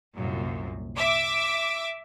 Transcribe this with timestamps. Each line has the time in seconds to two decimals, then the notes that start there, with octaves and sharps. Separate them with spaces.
0.14 C2 F#2 A#2
0.96 E5 D6